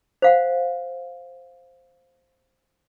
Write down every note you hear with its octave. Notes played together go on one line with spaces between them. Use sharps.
C5 F5 F#5